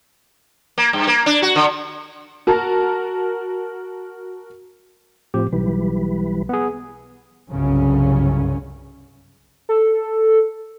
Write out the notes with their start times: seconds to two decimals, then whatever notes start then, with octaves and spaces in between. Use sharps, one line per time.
0.78 A#3
0.93 G2
1.07 A#3
1.26 D4
1.42 F#4
1.56 D3
2.47 F#4 A#4 A5
5.34 A2 F3 C4 G4
5.52 B1 E3 G3 B4
6.49 B3 G#4
7.51 G1 C2 F#2 C#3 C#4
9.69 A4